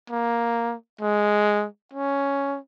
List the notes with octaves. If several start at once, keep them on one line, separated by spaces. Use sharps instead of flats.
A#3
G#3
C#4